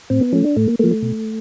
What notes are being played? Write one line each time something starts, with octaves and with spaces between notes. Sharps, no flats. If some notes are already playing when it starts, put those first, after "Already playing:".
A2 C4
B3
F3 A3 C#4
D4
A2 A3
A#3
F3 A3 A#3
A3
B2